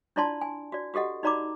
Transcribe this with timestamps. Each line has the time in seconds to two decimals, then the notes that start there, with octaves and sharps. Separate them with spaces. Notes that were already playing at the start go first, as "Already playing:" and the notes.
0.16 D4 E4 F4 D5 A5 C6
0.41 G#5
0.72 F#4 D5
0.94 F#4 G4 A4 D#5 F#5
1.23 D#4 F#4 D5 A#5 B5 D6